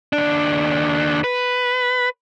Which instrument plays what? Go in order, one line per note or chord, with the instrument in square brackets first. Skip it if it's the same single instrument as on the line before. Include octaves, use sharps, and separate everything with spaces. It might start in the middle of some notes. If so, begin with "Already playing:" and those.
[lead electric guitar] D#2 D4
B4